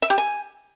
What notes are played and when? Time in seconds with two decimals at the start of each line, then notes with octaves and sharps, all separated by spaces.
0.02 E5
0.10 G4
0.18 G#5